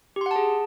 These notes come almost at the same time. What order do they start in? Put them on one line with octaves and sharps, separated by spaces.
G4 C6 F#5 A5 G#4